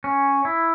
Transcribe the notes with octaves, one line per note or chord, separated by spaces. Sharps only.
C#4
E4